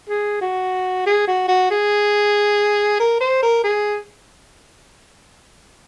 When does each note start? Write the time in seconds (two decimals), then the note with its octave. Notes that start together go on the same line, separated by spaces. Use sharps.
0.09 G#4
0.41 F#4
1.06 G#4
1.27 F#4
1.48 F#4
1.70 G#4
3.00 A#4
3.21 C5
3.43 A#4
3.64 G#4